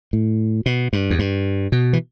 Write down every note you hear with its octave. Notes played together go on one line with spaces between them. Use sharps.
A2
B2
G2
E2
G2
B2
E3